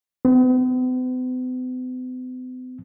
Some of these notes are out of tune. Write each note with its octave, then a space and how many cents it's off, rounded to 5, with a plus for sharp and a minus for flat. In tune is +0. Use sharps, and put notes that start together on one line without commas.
B3 +45